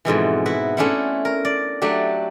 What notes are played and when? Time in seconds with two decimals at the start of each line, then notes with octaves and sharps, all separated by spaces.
0.05 F2 G#2 B2 E3
0.46 E4 F#4 B4
0.77 A3 C#4 D4 E4 C5 F#5
1.25 A#4
1.45 D5
1.82 F#3 A3 D4 G4